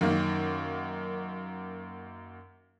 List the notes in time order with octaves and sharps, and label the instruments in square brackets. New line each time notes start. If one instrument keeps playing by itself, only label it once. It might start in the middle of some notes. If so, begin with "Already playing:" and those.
[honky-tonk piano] F#2 D#3 A#3